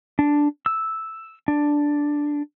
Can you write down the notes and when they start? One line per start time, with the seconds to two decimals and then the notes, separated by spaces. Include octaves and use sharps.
0.19 D4
0.66 E6
1.48 D4